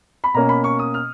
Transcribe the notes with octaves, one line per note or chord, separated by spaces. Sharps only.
B5
B2 A#3 C#4 A#5
B5
C#6
D#6
F6